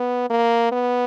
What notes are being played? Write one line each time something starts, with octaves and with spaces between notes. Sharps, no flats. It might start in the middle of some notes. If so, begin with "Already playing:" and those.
Already playing: B3
A#3
B3